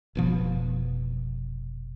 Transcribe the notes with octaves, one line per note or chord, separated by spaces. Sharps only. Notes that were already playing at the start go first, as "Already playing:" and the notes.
F1 B2 F3